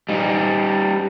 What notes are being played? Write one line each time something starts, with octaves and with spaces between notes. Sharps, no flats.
G3 D#4